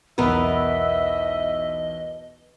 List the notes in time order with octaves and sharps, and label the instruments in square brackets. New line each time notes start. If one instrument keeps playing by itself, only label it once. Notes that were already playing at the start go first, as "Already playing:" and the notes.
[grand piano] B1 E2 [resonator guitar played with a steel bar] B3 A#4 B4 [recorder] D#5 [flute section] E5 E6